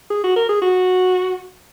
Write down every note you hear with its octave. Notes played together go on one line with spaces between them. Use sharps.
G#4
F#4
A#4
G#4
F#4